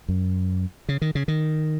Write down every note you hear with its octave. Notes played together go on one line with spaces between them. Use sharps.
F#2
C#3
D#3
C#3
D#3